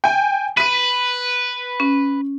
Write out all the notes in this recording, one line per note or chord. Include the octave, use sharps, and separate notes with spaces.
G5 G#5
B4 B6 D#7
C#4